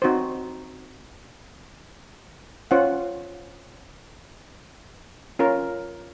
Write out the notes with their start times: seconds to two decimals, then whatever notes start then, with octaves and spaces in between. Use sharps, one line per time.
0.02 C4 D#4 F#4 C5
2.71 C#4 F4 C5 F#5
5.39 C#4 F4 A#4